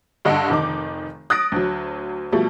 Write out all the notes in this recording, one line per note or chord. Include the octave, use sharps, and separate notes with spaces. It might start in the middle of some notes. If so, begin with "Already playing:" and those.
G2 D3 D#5 F#5 D7
F1 D#3 D#4 D6
D#6 F#6 A6 A#6 D7
D2 F#3
B2 F3 G3 A3